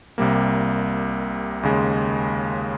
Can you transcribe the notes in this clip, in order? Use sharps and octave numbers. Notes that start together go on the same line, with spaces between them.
C2 C3 G3 A#3
D#2 C#3 G#3